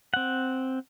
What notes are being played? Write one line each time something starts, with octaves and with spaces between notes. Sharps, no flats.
C4 F#5